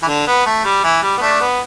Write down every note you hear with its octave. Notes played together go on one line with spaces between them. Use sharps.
E3
D3
B3
A3
G3
E3
G3
B3
A3 D4
B3